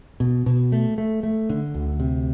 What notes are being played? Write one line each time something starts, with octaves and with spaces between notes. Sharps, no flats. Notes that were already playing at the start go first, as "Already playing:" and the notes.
B2
B2
A3
A3
A3
D3
D2
C3